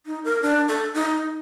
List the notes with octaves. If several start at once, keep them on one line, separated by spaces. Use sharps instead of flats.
D#4
A#4
D4
A4
D#4